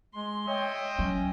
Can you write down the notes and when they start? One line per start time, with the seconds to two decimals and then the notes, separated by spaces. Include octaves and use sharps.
0.14 G#3 C6
0.48 C#5 D#5 E5 G5
0.99 F#3 C#4